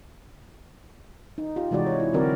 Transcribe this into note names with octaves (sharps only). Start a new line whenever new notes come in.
D#4
F4 G4
C3 E3 G#3 D#4 F#4 D5
C#5
E4
D3 F#3 C4 F#4 A#4 D5